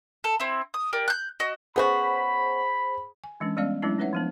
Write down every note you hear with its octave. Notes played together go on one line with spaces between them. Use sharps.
A4
C4 E4
D#6
G4 A#4 D5
F#6 G6
F#4 D#5
B3 C#4 F#4 G#4 C5 B5
G#5
E3 G#3 C#4 D4
G3 G#3 B3 C#4 D5 F5
F#3 G#3 A3 C#4 D4 E4
C#4 D#4 B4 C#5 E5 F#5
F3 B3 D4